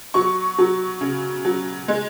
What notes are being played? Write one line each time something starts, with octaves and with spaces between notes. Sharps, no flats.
F#3 C#6
F#3
C#3
F#3
G#3